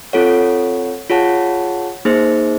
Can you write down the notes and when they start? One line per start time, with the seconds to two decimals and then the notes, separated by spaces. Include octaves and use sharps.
0.13 C4 F4 A4 C#5 F#5
1.10 F4 G#4 C#5 F#5 A5
2.05 A#3 D#4 G#4 C5